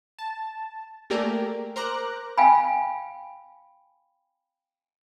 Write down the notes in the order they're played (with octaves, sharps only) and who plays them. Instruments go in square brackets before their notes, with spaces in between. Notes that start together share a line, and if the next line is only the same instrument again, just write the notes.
[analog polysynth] A5
A3 A#3 G4 G#4 A#4 D5
A#4 C5 A#5 D6 F#6
[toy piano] F5 G5 G#5 B5